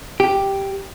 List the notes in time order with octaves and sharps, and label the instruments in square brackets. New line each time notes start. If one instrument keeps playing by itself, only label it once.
[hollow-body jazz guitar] G4